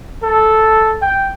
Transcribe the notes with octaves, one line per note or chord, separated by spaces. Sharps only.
A4
G5